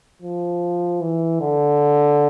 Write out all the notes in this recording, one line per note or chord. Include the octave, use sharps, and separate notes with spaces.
F3
E3
D3